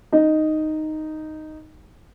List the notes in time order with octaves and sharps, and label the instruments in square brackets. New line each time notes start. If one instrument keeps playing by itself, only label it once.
[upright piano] D#4 D#5